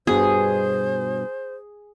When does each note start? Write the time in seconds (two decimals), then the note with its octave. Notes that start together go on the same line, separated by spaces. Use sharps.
0.07 G2 B2 G#4 C5